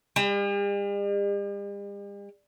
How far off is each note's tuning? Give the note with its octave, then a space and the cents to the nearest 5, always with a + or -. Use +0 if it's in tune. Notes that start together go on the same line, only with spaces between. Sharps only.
G3 +45